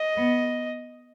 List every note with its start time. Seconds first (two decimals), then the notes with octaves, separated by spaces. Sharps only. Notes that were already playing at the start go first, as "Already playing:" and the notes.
Already playing: D#5
0.17 B3